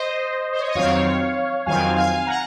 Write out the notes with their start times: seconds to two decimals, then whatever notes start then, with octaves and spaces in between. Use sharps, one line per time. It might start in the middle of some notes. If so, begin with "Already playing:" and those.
Already playing: C5 D#5
0.52 C5
0.60 C#5
0.68 D#5
0.75 F2 D#3 F#3 C4 C#5 F5
1.66 F2 D#3 F#3 C4 F5 G#5
1.96 F5 G#5
2.27 F#5 A#5